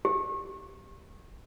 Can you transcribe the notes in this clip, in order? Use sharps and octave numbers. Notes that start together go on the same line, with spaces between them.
G4